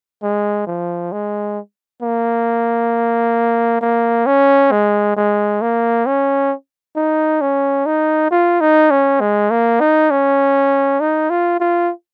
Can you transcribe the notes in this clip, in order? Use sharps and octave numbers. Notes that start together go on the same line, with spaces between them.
G#3
F3
G#3
A#3
A#3
C#4
G#3
G#3
A#3
C#4
D#4
C#4
D#4
F4
D#4
C#4
G#3
A#3
D#4
C#4
D#4
F4
F4